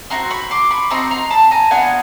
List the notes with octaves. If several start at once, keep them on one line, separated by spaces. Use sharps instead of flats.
C4 D#4 F#4 A#5 C6
B5 C#6
C6 D6
B5 C#6
C4 D#4 F#4 A#5 C6
A#5 C6
A5 B5
G#5 A#5
B3 D4 F4 F#5 G#5